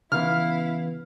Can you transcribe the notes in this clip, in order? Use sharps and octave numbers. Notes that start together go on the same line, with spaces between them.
C#3 E3 B3 E4 F5 F6